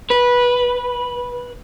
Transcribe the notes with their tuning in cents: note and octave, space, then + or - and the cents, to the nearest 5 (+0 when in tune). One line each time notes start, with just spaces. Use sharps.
B4 -15